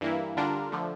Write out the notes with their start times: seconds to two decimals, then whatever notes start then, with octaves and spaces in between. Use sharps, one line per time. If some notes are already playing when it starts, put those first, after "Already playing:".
0.01 G2 E3 A#3 E4
0.37 D3 G3 D4 F4 A#4
0.72 D3 F3 A3